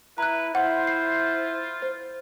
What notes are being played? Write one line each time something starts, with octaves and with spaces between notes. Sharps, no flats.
E4 B4 A#5 F#6
E4 F4 C5 F#5
C7
C5